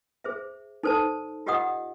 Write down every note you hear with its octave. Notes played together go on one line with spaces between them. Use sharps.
G#4 C5 E5
D#4 A4 C5 D5 A5
F4 G4 D5 D#5 F#5 D#6